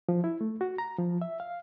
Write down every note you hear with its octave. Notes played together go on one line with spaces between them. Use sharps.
F3
E4
A3
F#4
A#5
F3
E5
F5